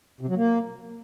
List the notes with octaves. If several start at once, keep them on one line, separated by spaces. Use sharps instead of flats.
C3
F#3
A#3